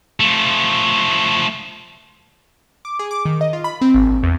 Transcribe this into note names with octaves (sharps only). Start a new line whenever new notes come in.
F3 A3
D6
G#4
D6
D#3
D#5
F4
B5
C4
G#1
A#1
E2